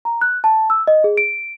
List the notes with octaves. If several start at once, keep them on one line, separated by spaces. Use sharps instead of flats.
A#5
F#6
A5
E6
D#5
G#4
D7